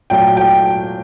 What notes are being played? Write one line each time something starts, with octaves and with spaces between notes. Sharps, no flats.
A#2 F#3 A3 G5
G5